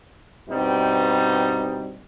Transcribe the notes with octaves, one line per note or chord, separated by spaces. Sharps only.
G2 B2 G3 C4 D#4